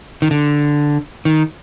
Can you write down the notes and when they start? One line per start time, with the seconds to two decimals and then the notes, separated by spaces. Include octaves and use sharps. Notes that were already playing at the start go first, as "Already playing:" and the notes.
0.22 D#3
0.31 D3
1.25 D#3